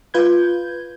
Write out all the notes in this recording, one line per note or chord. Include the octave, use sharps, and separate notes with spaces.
F4 B4 G6 G#6